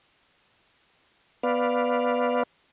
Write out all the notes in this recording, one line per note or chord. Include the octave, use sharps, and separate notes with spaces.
B3 B4 D5 F5